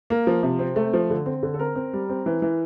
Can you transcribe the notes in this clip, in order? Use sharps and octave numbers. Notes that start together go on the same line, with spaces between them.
A#3
F3
C3
C4
A3
F3
D3
C4
D3
A4
C4 A#4
C4
G3
C4
E3
E3